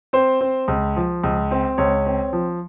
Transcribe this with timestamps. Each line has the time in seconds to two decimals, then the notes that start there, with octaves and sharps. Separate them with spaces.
0.13 C4 C5
0.41 C4
0.68 C#2
0.97 F3
1.23 C#2
1.51 C4
1.78 C#2 C#5
2.06 C4
2.33 F3